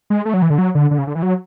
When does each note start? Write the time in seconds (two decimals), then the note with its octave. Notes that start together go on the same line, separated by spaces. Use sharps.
0.10 G#3
0.25 A3
0.34 F#3
0.42 E3
0.50 D3
0.58 F#3
0.75 D3
0.91 D3
0.98 C#3
1.07 D3
1.15 E3
1.22 F#3